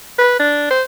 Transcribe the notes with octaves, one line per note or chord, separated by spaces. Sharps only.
B4
D4
C5